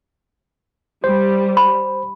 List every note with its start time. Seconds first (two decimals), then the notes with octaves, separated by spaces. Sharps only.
1.04 G3 C5
1.57 B5